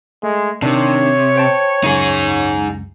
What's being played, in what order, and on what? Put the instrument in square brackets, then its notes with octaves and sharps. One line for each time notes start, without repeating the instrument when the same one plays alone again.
[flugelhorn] G#3 [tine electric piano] A3
[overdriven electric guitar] C3 [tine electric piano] D#3 D4 [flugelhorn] C#5
[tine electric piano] C5 G5 A5
[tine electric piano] C#2 F#2 [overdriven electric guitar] D#4 G#4